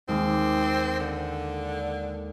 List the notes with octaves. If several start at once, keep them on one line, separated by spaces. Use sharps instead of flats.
D#2 G#3 C4 D6
D3